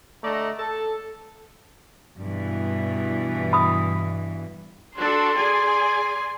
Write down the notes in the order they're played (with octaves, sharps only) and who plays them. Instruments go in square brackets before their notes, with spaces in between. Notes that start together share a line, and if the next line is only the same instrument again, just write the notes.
[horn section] D3 A3 D5 D#5 A#5
A4
[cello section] G2 B2 E3
[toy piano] B5 D#6
[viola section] D4 F#4 A4 [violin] C6
[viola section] G#4 D5 G#5